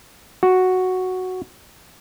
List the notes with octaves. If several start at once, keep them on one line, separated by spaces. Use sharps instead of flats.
F#4